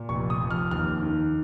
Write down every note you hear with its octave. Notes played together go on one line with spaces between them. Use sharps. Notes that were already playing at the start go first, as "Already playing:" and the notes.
Already playing: A#2
F1 C#6
D#6
F2
F6
D#2 F6
D#3